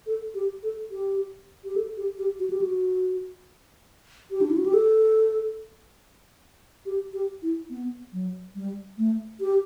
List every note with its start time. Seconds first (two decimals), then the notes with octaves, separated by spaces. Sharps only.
0.07 A4
0.35 G4
0.63 A4
0.91 G4
1.64 G4
1.76 A4
1.97 G4
2.19 G4
2.40 F#4
2.50 G4
2.61 F#4
4.31 G4
4.41 D4
4.50 E4
4.57 F#4
4.66 G4
4.74 A4
6.86 G4
7.13 G4
7.43 E4
7.70 B3
8.13 F#3
8.55 G3
8.98 A3
9.40 G4